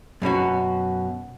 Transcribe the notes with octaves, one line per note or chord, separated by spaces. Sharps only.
F#2 B2 C#4 F#4